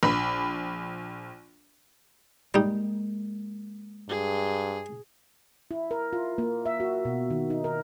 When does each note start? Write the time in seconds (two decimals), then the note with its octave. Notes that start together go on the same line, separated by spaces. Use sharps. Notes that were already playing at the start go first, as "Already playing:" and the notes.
0.03 A#1 B5
2.54 G3 G#3 A#3 D#4
4.08 G2 G#4
5.71 E4
5.91 A#4
6.13 F4
6.38 A#3
6.66 E5
6.80 F#4
7.05 B2
7.30 D#3
7.50 D#4
7.64 A#4